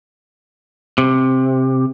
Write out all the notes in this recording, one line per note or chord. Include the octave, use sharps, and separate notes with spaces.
C3